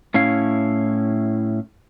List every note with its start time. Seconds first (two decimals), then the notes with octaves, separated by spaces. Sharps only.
0.14 A2 C#4 E4 F5